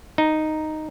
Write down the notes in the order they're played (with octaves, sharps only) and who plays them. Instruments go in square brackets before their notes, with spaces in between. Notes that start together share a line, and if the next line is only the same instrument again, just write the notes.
[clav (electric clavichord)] D#4